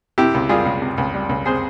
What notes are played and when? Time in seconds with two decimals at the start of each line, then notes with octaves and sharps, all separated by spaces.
0.18 C3 E4 G4
0.34 C#2
0.49 G3 F4 G#4
0.66 C#2
0.82 C3
0.98 C#2
1.14 G3
1.29 C#2
1.46 C3 G#4 C5